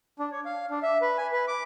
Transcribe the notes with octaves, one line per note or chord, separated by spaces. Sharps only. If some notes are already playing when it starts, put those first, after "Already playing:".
D4
C#5
F5
D4
E5
B4
G#5
B4
D6